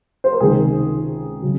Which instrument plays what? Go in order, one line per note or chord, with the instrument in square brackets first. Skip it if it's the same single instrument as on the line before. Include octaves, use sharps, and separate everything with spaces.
[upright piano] C5
A#4
C#2 C3 D#3 G#4
C#3 F#3